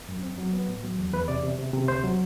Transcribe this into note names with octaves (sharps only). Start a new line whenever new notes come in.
F#2
C4
F#3
B3
A2
F#3
E2
E2 B4
C3 D5
C3
C3
C3
D2 C5
F#3